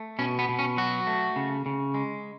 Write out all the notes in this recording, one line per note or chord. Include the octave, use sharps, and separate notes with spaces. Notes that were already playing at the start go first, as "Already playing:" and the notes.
Already playing: A3
B2 C#4
B3
B2
C#4
F#3 F#4
A3
C#3
C#3
G#3